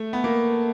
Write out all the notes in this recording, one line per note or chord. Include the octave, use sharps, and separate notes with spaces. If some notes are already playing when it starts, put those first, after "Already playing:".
Already playing: A3
B3
A#3